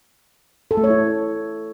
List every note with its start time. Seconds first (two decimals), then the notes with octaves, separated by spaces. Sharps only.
0.71 A4
0.77 A3
0.84 C#5
0.90 E4